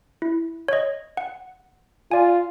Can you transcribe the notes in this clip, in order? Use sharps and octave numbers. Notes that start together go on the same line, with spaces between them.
E4
C#5 D#5
F#5
F4 D5 G#5